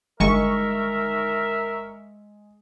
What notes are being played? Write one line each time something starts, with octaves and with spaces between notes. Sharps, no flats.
G1 D#3 G#3 A#4 E5 C#6